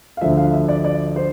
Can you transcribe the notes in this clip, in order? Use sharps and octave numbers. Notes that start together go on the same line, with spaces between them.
F5
D2 D3 F3 E5
F5
E5
D5
D5
C5